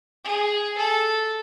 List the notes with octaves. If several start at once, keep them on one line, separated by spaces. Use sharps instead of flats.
G#4
A4